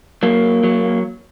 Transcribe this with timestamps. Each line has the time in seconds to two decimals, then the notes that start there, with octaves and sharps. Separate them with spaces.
0.23 F#3 A#3
0.64 F#3